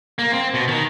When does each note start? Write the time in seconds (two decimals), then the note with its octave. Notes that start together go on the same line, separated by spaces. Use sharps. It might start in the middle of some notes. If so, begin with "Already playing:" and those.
0.19 A#3
0.32 C4
0.54 B2
0.68 D#3